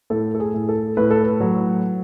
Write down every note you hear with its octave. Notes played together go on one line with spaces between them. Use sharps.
A2 A4
A4
G#4
A2
A4
A2 B4
A4
B4
F#3